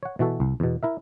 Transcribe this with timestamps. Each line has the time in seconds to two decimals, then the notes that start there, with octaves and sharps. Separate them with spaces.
0.03 C#5 F#5
0.19 B2 E3 F#4 A4
0.40 C2
0.60 E2 B2
0.83 E4 A#4 E5